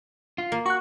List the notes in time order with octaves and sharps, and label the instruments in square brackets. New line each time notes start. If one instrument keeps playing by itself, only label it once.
[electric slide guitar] F4
[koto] A#3
[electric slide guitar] F#4 [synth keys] C#6 F#6